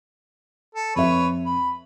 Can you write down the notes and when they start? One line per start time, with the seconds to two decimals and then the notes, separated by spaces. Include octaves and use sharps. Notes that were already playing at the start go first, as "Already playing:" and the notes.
0.75 A4
0.96 F2 B4 C#5 E5
1.46 B5